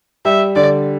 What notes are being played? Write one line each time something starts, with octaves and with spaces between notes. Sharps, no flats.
G3 E5
D3 D5